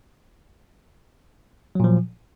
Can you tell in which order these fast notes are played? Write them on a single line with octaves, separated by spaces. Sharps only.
F#3 A#2 F3